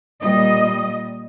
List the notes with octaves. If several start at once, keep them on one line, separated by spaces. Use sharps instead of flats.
A#2 G3 D#5